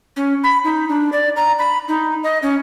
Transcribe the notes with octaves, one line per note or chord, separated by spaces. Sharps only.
C#4
B5
D#4
D4
D5
A#5
B5
D#4
D#5
C#4